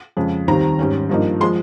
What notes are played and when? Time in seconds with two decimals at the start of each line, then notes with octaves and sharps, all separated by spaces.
0.17 F2 C#3 G#3
0.48 D#2 D#3 G3 C4 A#5
0.79 G#2 G3 C#4
1.10 G2 F3 A#3 D#4
1.40 F3 G#3 C6